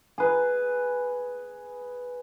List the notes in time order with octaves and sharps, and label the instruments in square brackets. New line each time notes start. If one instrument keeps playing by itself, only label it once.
[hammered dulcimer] G#4 B4